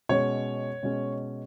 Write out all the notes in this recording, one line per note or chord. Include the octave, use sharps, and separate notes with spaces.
B2 G#3 C#4 C#5
B2 G#3 C#4